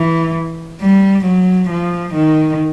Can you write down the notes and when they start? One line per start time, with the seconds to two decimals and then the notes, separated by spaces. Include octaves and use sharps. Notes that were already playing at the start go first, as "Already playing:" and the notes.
Already playing: E3
0.81 G3
1.25 F#3
1.70 F3
2.15 D#3